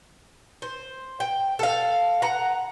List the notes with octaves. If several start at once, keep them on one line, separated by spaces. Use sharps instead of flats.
C5
G5
A4 F5
F#5 A#5